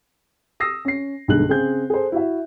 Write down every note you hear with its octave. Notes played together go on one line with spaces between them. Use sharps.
D#6 E6 A#6 C7
C#4 C7
B1 G2 D3 G#3 F#6 F#7
C#3 C4 G#4 G6
G#4 A4 C5
E4 F#4 E5